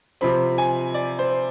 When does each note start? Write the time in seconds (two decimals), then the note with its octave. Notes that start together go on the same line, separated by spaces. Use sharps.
0.21 C3 F3 C4 B5
0.58 G#5
0.94 D5
1.19 C5